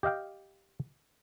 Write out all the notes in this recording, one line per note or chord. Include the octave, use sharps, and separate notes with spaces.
G4 D#5 F5 G5